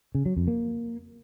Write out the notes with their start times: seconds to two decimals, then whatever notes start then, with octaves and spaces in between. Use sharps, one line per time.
0.15 C#3
0.26 F#3
0.37 F2
0.48 A#3